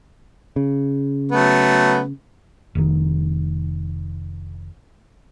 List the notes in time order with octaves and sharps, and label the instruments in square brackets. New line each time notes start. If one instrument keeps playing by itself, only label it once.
[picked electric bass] C#3
[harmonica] F#3 A3 B3
[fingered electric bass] F1 D#3